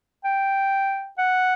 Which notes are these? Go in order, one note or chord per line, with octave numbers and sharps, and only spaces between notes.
G5
F#5